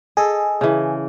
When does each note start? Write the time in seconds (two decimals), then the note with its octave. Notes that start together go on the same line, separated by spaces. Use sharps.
0.17 G#4 A4 D#5
0.61 C#3 E3